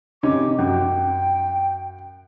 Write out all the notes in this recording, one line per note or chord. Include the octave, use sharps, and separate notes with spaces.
C3 C#4 D#4 D6
F#2 G5